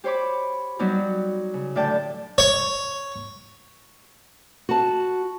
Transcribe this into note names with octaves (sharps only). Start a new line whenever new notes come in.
G4 C5 C#5 B5 D6
F#3 G3 B3 D#4 G4
C#3
A2 D3 D5 G5 A5 G6
C#5
F#4 A5